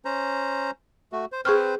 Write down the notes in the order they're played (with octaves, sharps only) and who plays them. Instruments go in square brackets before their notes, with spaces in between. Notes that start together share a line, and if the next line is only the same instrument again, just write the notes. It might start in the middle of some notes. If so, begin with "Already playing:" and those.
[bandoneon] C#4 C5 A#5
A3 F#4
C5
[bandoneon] C4 B4 C5 [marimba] G#4 C#6 F6